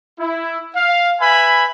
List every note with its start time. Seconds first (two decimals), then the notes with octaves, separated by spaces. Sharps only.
0.19 E4
0.75 F5
1.21 B4 E5 G#5 B5